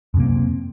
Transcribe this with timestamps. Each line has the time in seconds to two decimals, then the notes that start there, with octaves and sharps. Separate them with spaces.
0.14 F#2
0.17 C3
0.20 A#3
0.23 C4